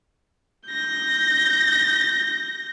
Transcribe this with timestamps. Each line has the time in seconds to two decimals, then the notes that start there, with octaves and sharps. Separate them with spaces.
0.69 G6 A#6